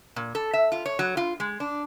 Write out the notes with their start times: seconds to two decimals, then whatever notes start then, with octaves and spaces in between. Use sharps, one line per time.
0.16 A#2
0.35 A4
0.53 E5
0.72 F4
0.86 C#5
0.99 F#3
1.17 F4
1.40 G#3
1.60 D4